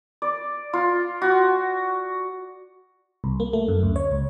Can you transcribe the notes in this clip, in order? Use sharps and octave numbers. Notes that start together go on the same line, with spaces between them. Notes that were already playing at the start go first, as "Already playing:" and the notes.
D5
F4
F#4
C2
A#3
A3
F#2
D2
C#5
C#2